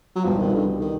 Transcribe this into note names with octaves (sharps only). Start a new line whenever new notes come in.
F#3
C2 B2 F3 G3 B3
D#3
D3
D#3